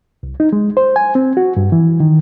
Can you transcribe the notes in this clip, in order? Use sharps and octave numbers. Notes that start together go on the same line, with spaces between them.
C2
D#4
G#3
C5
G#5
C4
F#4
G2
E3
D#3